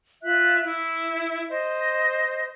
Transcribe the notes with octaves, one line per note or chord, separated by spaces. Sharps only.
F4 E5 F#6
E4
C5 D#5